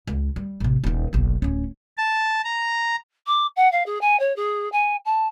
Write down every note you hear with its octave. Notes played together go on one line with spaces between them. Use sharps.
C#2
G3
A1 C3
D#1 D#4
F#1 B1
D1 C#4
A5
A#5
D6
F#5
F5
G#4
G#5
C#5
G#4
G#5
A5